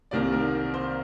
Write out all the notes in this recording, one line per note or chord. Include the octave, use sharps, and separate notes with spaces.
C2 C3 D#3 A#3 D5
A#4
C5